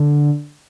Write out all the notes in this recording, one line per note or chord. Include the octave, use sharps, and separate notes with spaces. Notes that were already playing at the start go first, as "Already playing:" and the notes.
Already playing: D3